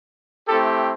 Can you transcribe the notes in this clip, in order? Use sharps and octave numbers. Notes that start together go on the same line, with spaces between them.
A3 C4 E4 G4 A4